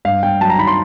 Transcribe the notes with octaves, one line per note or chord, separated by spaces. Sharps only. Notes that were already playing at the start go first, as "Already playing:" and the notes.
G2 F5
G2 G5
F#3 A5
A#5
D#3 B5
C6